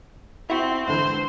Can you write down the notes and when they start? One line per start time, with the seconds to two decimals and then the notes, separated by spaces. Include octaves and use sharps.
0.50 C4 E4 F#4
0.87 G#2 D3 E3 C5